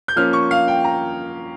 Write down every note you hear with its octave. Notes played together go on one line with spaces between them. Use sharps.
G6
F3 A#3 C#4 F6
C#6
F5
G5
A#5